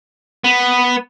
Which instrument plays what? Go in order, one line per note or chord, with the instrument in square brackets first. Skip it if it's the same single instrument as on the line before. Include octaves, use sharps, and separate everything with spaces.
[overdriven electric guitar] B3